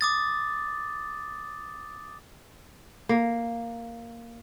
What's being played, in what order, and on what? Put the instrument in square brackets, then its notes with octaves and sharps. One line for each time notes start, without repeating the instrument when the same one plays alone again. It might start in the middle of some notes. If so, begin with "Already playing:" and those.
[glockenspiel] D6 D#6 A6
[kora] A#3